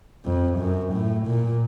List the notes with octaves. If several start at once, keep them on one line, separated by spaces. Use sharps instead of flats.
F2
F#2
A2
A#2